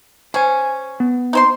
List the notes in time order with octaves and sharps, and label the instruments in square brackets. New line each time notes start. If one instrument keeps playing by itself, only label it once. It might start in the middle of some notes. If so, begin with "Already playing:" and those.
[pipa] C#4 [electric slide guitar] C5 G#5
[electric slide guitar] B3
[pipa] D#4 C5 C6